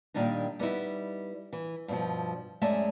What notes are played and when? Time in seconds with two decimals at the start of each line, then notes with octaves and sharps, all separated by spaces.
0.14 A#2 D#3 G3 D4 D#4
0.59 G3 B3 D#4 E4
1.53 E3
1.88 G2 B2 F3
2.61 F#2 G#3 A3 D5 E5 A5